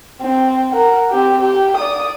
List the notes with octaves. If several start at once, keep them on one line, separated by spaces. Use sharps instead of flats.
C4
A#4 F#5
C4 G4
G4
D5 D#6